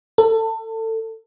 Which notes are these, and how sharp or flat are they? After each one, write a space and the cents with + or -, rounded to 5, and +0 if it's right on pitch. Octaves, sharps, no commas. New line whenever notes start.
A4 +25